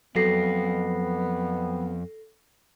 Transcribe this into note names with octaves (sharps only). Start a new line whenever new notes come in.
F2 F#3 B3 A4 A#6 C7